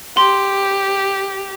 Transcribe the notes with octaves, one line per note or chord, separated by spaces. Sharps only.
G4 C6